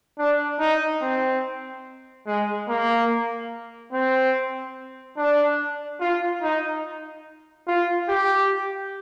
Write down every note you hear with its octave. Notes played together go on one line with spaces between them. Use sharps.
D4
D#4
C4
G#3
A#3
C4
D4
F4
D#4
F4
G4